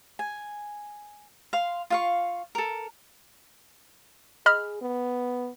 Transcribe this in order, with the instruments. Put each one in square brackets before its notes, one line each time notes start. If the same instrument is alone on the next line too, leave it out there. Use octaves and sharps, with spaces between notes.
[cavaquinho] G#5
F5 C6
F4 F5 C#6
A4 A#4
[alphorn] G#4 [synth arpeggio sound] D#5 B5 F6
[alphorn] B3